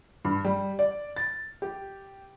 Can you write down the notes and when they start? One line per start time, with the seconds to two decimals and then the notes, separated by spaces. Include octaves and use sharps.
0.25 G2
0.45 G3
0.79 D5
1.16 A6
1.62 G4